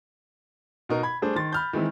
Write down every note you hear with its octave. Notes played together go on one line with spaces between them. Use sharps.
B2 D#4 A#4
B5 G#6
G3 A3 D4 G#4 C5
D#3 C6 A6
B5 F6 G6
D#3 E3 G#3 C4 E4